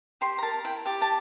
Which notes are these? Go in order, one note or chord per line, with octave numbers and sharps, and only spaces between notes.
G4 C6
A#5
A#4 A5
E4 G5
G4 A5
A5